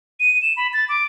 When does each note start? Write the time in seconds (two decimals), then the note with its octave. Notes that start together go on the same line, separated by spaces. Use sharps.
0.20 D#7
0.42 E7
0.57 B5
0.73 A6
0.89 D6